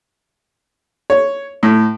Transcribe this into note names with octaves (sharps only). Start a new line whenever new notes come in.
C#5
A2